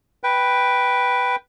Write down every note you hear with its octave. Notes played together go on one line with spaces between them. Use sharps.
B4 G5